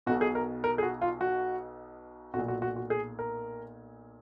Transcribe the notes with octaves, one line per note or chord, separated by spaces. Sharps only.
B1 B2 F#4
G#4
A#4
A#4
G#4
F#4
F4
F#4
B1 A#2 F#4
F#4
F#4
F#4
G#4
A#4